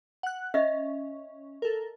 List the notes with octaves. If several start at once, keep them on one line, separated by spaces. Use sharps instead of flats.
F#5 F#6
C#4 D#5 E5
A4 A#4